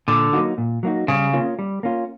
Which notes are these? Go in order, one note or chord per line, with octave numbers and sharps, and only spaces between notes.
A#2 D3
F#3 A#3 D#4 F#4
A#2
F#3 A#3 D#4 F#4
C#3 G3
A#3 C#4 F4
G3
A#3 C#4 F4